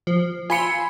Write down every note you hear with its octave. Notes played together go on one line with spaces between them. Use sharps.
F3
F4 G#5 B5 C6 E6 C#7